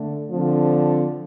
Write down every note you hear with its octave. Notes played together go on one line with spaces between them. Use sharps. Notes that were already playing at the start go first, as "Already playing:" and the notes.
Already playing: D3 A3
D3 F3 C4